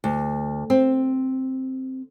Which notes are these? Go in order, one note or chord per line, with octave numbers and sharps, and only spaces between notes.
D2
C4